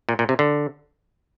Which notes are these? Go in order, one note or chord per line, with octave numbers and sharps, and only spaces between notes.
A#2
A#2
C3
D3